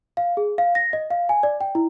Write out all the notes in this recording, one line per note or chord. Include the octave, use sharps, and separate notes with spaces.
F5
G#4
F5
A#6
D#5
F5
G#5
D5
G5
E4